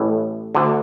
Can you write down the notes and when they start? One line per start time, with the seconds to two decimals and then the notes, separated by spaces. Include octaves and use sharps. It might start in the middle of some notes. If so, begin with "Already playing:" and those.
Already playing: A1 A2 E3
0.55 D2 D3